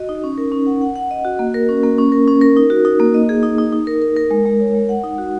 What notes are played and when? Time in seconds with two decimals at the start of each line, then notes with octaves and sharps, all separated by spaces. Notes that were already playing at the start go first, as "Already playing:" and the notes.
Already playing: F#4 D#5
0.09 D#4
0.24 C#4
0.38 A#4
0.52 C#4
0.66 F#5
0.82 F#5
0.96 F#5
1.11 D#5
1.24 F#4
1.39 A#3
1.54 A#4
1.69 C#4
1.83 A#3
1.98 C#4
2.12 A#4
2.27 C#4
2.41 A#4
2.56 D#4
2.70 F#4
2.85 D#4
3.00 A#3
3.14 D#5
3.29 G#4
3.43 D#4
3.58 D#4
3.73 D#4
3.87 A#4
4.02 A#4
4.17 A#4
4.31 G#3
4.45 G#3
4.60 C#5
4.75 G#3
4.89 F#5
5.04 D#4
5.18 F#4